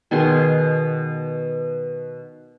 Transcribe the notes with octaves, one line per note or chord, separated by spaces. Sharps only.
B2 D#3 G#4 C6